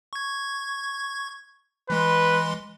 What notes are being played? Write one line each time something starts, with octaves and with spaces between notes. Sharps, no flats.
C#6 G#6
E3 G#3 B4 C6